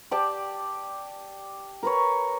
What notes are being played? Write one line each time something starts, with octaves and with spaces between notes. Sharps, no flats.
G4 D5 G5 A5
A#4 B4 C#5